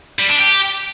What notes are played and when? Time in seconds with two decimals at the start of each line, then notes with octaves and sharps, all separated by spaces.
0.19 G3
0.29 D4
0.39 G4